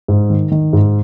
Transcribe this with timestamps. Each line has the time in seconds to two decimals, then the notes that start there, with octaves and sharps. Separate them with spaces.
0.08 G#2
0.30 D#3
0.51 D#3
0.73 G#2